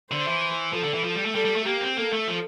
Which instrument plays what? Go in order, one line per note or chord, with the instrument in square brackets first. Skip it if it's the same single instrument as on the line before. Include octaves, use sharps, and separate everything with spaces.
[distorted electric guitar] D3 [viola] C5
[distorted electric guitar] E3
[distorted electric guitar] F3 [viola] A4
[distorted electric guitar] D3
E3
F3
G3
A3
[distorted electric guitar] G3 [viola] A4
[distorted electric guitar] G3
A3
[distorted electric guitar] A#3 [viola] G4
[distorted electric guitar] C4
[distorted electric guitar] A#3 [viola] A4
[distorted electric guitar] A3
F3